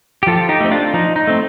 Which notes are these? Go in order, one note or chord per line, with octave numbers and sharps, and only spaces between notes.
G4
F3 F4 A4
D#4 G4
A3 C4
D4 F4
F3 D#4
D#4
A3 C4